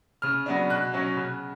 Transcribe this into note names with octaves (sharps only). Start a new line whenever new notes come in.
C#3 F6
F#3 B3 D4
B2 F#6
F#3 C#4
C#3